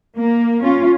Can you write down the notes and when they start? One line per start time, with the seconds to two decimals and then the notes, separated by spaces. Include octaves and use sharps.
0.18 A#3
0.64 C#4 F4